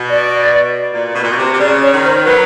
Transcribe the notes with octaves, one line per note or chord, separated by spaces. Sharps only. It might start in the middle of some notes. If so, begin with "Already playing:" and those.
Already playing: B2
D5
A#2
B2
A#2
B2
C3
C3
C#3 D5
C#5
D#3
C5
F#3 B4